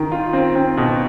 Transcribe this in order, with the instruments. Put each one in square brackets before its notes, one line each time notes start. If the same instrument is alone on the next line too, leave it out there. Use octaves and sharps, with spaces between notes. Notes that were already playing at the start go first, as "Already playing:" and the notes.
Already playing: [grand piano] D#3
F4
C4
C4
B2